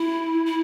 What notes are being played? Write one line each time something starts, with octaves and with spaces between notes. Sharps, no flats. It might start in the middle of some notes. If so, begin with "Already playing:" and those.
Already playing: E4
E4